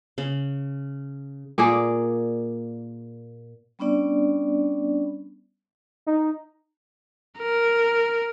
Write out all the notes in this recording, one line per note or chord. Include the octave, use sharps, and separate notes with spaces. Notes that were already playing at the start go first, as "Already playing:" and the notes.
C#3
A#2 A#3 G#4 D5
G3 B3 C#4 D4 D5
D#4
A#4